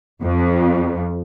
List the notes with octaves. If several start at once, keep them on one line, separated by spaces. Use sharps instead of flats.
F2